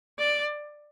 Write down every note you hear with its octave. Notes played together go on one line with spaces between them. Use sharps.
D5